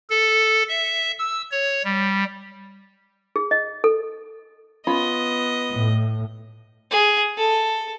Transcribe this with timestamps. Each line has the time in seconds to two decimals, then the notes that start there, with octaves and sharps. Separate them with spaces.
0.10 A4
0.69 E5
1.19 E6
1.51 C#5
1.84 G3
3.36 G#4
3.51 D#5
3.84 A4
4.87 B3 C#4 F4 D#5 B5
5.73 A2
6.91 G#4
7.37 A4